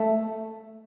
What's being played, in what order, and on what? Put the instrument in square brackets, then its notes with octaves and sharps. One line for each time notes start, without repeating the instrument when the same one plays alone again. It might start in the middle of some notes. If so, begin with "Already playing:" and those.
Already playing: [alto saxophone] A3